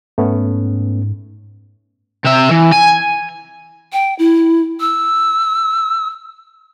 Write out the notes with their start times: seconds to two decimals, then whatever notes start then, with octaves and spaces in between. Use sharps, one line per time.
0.18 G#2 A3 B3 C#4
2.25 C3 E5
2.51 E3
2.72 G#5
3.93 G5
4.19 E4
4.81 E6